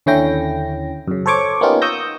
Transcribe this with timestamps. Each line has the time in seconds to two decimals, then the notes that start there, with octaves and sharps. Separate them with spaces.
0.06 D#2 D3 C#4 E4 G5 A#6
1.08 F#2 C#3
1.26 A4 C5 C#5 C#6 D6
1.61 A#3 B3 C#4 D#4 F4 G4
1.82 C#6 D#6 E6 G6 A#6